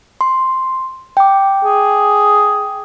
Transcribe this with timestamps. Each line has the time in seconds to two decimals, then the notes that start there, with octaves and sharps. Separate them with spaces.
0.21 C6
1.17 G5 D6
1.65 G#4